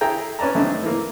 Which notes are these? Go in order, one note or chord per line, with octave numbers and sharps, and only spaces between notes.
E4 G#4 A4 G5 A#5
C#4 B4 D5 A5 A#5
F#2 A3 C4 D4 D#4 A5
E3 A#3